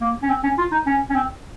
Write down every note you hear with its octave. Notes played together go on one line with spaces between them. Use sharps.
A#3
C#4
C4
C#4
F4
D#4
C#4
C#4
C4